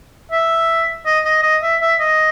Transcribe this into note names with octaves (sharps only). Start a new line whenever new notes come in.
E5
D#5
D#5
D#5
E5
E5
D#5